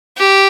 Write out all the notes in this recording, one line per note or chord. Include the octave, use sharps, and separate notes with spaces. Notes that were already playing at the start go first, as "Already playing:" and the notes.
G4